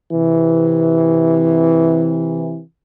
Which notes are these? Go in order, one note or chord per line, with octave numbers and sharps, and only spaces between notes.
C3 E3